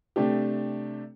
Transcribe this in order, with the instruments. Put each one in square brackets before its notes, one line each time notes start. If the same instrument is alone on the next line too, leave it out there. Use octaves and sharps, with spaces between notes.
[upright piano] C3 A3 D4 G4